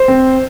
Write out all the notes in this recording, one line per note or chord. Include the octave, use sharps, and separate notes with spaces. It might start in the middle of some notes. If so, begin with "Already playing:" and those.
Already playing: C5
C4